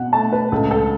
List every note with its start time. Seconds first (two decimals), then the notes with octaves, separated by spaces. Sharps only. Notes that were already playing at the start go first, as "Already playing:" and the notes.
Already playing: B2 F#5
0.12 A3 A5
0.33 B4
0.52 C#2 A4
0.71 A4